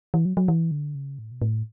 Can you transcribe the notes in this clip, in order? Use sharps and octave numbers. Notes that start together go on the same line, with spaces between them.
E3
F#3
F#3
E3
D3
C#3
A2
B2
A2